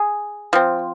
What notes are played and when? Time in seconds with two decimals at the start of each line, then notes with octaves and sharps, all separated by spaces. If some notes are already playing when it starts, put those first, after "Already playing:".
Already playing: G#4
0.53 F3 C4